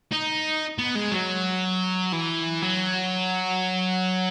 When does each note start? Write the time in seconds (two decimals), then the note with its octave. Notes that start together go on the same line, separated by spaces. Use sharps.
0.12 D#4
0.79 B3
0.95 G#3
1.12 F#3
2.13 E3
2.62 F#3